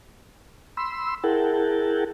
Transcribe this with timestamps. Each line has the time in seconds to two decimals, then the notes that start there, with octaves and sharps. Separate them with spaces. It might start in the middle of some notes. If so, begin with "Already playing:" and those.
0.77 B5 C6 E6
1.24 E4 G#4 A#4 F#5 G5 A5